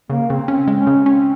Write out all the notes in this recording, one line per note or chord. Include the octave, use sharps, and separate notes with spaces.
C#3 A#3
C#3 C4
C4 C#4
G#3
C#4
C#3
C4 C#4